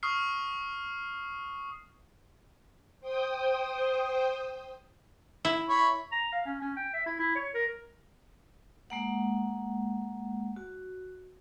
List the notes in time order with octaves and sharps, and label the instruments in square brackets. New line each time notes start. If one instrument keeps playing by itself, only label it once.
[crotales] C#6 D#6 F6 C7
[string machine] C5 G5 D#6
[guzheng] E4
[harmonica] C#5 B5
[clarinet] A#5
F5
C#4
C#4
G5
E5
E4
E4
C#5
A#4
[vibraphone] G#3 A#3 F#5
F#4